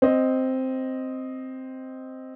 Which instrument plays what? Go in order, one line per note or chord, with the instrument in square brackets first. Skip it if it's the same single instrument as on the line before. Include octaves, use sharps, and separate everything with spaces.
[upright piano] C4 D#5